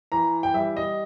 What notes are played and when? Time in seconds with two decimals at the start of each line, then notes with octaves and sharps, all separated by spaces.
0.12 E3 A#5
0.43 G5
0.54 G3 E5
0.77 D#5